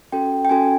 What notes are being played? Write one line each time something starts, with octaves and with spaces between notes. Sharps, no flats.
C#4 F#4 A4 G5
G5
C#4 F#4 A4 G#5